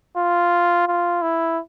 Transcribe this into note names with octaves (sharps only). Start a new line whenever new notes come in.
F4
F4
E4